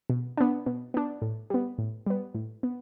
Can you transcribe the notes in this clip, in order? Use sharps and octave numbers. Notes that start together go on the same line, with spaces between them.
B2
B3 D4
B2
B3 D4
A2
G3 B3
A2
G3 B3
A2
B3